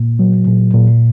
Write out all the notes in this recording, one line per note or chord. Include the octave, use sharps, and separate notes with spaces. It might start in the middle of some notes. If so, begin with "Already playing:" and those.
Already playing: A#2 A#3
F#3
A#2
A#2